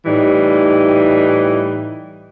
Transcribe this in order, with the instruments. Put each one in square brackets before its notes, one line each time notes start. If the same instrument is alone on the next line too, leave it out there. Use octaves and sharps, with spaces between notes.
[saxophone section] A2 E3 G3 D#4